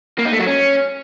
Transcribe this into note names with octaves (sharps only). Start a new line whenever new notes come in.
A#3
D#4
A3
F#3
C#4